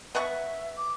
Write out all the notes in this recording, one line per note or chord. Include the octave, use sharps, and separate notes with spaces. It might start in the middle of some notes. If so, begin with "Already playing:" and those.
B3 E5 F#5 C#6
D6